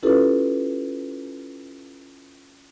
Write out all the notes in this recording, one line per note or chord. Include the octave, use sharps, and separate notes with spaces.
C#4 E4 F4 G4 A4 B4